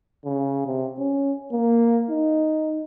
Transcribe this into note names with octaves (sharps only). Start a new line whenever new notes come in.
C#3
C3
C#4
A#3
D#4